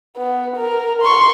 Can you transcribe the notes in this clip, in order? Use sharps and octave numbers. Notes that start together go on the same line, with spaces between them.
B3
A#4
C6 C#6